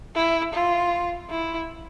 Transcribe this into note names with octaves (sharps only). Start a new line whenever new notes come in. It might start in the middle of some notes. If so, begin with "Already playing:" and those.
E4
F4
E4